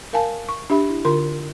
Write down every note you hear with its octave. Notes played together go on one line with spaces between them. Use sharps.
A#4 F5 G#5 A5
C#6
D4 G4 E5 B5
E4
D3 F4 A#4 C6